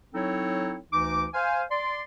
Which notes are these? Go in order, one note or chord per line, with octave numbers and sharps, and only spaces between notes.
F#3 C4 D#4 E4 A4 C#5
D2 E3 D#4 D6
C5 F5 G#5
D5 C6